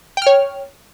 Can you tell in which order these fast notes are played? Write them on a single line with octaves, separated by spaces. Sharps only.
G5 F6 C#5